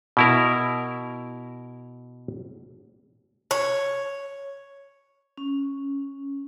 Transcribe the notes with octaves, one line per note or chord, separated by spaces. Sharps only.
B2 E4 A#4
C#5
C#4